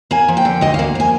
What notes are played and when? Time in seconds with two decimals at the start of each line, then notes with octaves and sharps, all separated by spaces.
0.11 A#3 G#5
0.28 F3
0.37 G5
0.45 D3
0.61 D2 D#5
0.74 F5
0.79 A#3
0.95 F3 G#5